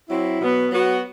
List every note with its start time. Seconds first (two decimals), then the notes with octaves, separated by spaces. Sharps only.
0.09 F#3 C4 E4
0.40 B2 F#3 B3
0.70 F#3 B3 F#4